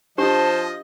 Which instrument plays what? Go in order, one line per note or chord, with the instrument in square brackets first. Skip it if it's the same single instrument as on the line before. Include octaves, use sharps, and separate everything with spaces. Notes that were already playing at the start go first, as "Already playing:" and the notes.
[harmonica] F3 D#5 [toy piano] D4 G4 [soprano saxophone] C5 [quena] A5